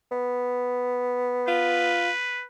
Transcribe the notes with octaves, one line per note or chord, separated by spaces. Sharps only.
B3
F4 B4